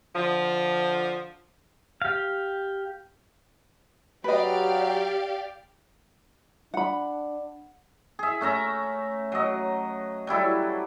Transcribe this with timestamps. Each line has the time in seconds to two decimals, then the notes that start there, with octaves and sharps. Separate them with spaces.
0.15 D3 F3
2.02 G4 F5
4.24 F#3 G4 B4 D5 D#5 F5
6.74 D4 F#5 B5
8.19 G#4 E5
8.41 A3 C#4 E5 A#5
9.32 F#3 D#5
10.27 F#3 G3 E4 A4